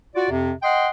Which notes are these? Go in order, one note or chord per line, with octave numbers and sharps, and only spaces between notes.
F4 F#4 D5
F2 C3
D#5 F#5 G5 C6